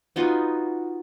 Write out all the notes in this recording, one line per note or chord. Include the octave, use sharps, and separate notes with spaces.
B3 D#4 F4 F#4